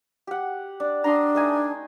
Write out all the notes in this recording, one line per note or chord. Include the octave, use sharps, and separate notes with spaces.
G4 F#5
D4
D4 A#5 C6 D#6
A3 D#4 G#5